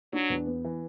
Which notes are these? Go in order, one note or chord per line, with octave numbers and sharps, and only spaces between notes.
F#3 D4
E2
B3
E3